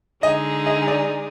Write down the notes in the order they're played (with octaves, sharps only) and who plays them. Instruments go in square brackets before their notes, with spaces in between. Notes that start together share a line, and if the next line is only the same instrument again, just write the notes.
[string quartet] D3 G#3 D#4 G#4 [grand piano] D#5
[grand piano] D#5
D5